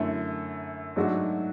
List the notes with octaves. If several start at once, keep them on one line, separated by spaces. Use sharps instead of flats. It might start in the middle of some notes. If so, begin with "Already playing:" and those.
Already playing: F#2 D3 A3 E4
G#2 F#3 A3 D4 F#4